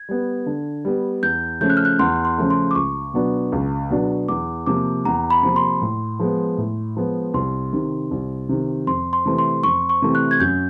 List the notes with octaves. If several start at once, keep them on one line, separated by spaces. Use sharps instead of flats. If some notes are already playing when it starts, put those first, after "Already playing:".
Already playing: G#6
G3 B3
D3
G3 B3
E2 G6
C#3 F3 A3 C#4 G6
F#6
F6
F#6
E2 C6
C6
C#3 F3 A3 C#4
C6
D6
C#2 C#6
B2 F#3 B3 D4
C#2
B2 F#3 B3 D4
E2 D6
C3 F3 A#3 D6
E2 A#5
B5
C3 F3 A#3
C6
A2
F3 G#3 B3
A2
F3 G#3 B3
C2 C6
C3 D#3
C2
C3 D#3
F2 C6
C6
C3 E3 A3 C4
C6
F2 C#6
C#6
C3 E3 A3 C4
F#6
G#6
F#2 G6